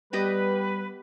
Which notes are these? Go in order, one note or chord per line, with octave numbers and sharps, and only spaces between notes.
G3 B3 G4 B4 D#5